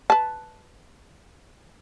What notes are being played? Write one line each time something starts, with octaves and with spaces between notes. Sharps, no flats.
B4 A5